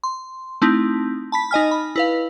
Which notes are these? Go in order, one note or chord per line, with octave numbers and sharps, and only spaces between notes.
C6
A3 C4 D#4 E4
A5 B5 B6
D#4 D#5 G#5 F6
B5
E4 B4 F5